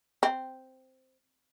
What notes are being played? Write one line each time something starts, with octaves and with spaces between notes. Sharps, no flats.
C4